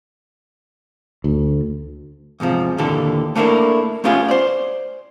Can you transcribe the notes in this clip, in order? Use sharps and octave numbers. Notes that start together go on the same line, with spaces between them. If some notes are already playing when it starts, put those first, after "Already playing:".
D2
E2 G#2 C3 F3
D#2 A#2 D3 E3 G4 A4
A3 A#3 D4 E4 A#4
A3 B3 C#4 F4 G4 G#4
C5 D5